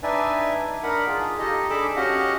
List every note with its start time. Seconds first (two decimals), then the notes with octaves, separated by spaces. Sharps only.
0.03 D4 D#4 B4 D5 E5 G#5
0.83 D4 D#4 A#4 F#5 B5
1.07 F4 G#4
1.39 D#4 G4 A4 D#5
1.70 D4 G#4 A4 B5 D6 E6
1.97 C#4 F#4 G4 D#5 F5 F#5